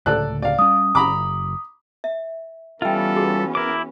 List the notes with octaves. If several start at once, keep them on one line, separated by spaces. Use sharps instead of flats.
C#2 A2 D3 A4 D5 F#6
D5 F5
G3 C#4 D#6
F#1 A#5 B5 D6
E5
E3 G3 B3 C#4 F4 A4 E5 G5
F#4 G#4
E4 A#4 D6